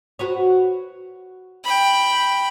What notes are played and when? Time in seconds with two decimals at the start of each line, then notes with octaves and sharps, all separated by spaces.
0.19 F#4 B4 C#5
1.64 G5 B5